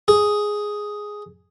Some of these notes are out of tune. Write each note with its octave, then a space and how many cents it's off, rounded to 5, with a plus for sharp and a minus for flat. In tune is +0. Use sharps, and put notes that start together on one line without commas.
G#4 +0